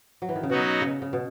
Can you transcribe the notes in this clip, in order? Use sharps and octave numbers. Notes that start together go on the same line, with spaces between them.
F#3
E3
D#3
C#3
B2 F#3 B3 D#4 F#4
C#3
C#3
B2